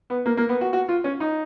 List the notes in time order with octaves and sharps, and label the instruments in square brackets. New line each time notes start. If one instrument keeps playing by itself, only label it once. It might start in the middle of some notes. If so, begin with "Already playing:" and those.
[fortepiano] B3
A#3
A#3
B3
F#4
F#4
F4
C#4
D#4